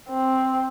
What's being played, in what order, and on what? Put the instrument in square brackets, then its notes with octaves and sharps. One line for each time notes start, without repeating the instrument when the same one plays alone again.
[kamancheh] C4